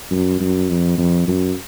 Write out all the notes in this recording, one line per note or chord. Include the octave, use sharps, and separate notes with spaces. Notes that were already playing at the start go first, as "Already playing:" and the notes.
F#2
F#2
F2
F2
F#2